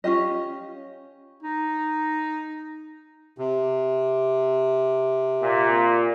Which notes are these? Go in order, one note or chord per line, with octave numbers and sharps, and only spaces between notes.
C#4 F4 G4 D#5
D#4
C3
A#2